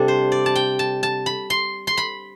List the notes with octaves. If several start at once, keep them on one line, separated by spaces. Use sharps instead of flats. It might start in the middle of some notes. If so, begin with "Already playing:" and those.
Already playing: C3 G3 D4 A4
C5
D5
A5
G5
A5
A5
B5
C6
C6
B5